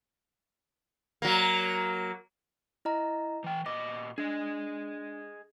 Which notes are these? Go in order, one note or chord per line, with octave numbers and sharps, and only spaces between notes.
F#3 A#3
E4 D#5 A#5
E3 G5
A#2 B4 D#5 D6
D4 G#4 D#5